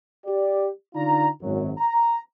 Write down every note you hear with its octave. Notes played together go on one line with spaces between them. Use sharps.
G4 D5
D3 D#4 F4 D5 A#5
G#1 F#2 F#3
A#5